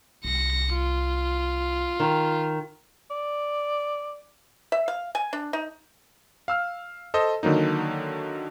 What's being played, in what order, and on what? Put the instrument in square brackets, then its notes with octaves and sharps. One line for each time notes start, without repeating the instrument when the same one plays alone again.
[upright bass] C2 [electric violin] A#6 C#7
[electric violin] F4
[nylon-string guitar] D#3
[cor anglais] D5
[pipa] E5
F5
G#5
D4
D#4
[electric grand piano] F5 E6 F6
A4 C5 D#5
D3 D#3 F#3 A#3 D#4